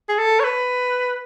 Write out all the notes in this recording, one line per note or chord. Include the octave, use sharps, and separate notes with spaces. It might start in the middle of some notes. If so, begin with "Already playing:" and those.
G#4
A4
C#5
B4